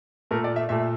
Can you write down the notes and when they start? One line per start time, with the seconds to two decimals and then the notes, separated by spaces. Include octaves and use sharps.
0.31 A#2 A3 A#4
0.44 D5
0.56 E5
0.69 A#2 A3 E5